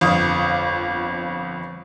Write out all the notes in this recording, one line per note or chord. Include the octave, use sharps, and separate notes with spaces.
G1 F2 F5 D6 D#6